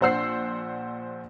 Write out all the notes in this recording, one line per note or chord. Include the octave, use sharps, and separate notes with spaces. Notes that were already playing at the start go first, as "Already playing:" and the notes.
A#1 D4 C5 F#5 E6 C7